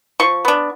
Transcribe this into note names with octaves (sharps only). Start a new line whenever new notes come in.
F3 C#6
B3 D4